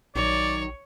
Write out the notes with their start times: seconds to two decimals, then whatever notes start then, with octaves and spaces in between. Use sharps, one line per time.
0.15 A#1 D#3 F#3 C#5 D5